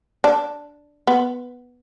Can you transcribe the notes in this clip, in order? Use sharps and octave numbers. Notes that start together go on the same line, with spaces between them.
D4
B3